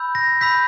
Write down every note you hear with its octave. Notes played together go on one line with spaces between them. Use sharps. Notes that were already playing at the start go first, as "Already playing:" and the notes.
Already playing: B5 E6 G6
A#6
B5 E6 G6 B6